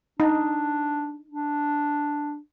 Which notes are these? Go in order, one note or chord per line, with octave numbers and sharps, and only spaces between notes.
D4 D#4
D4